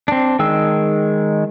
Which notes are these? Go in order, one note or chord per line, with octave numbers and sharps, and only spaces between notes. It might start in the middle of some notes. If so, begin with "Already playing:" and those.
C4 D4
D#3 G#3 G5 E6